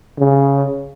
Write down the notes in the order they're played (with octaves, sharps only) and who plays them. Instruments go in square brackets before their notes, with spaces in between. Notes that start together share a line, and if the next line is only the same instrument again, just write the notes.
[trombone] C#3